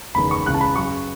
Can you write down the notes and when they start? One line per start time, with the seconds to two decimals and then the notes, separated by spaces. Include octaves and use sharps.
0.15 F#1 E2 D#3 G#3 B5
0.31 C#6
0.46 C#2 C#3 E3 F#6
0.54 A5
0.61 B5
0.76 F#2 C#3 F#3 C#6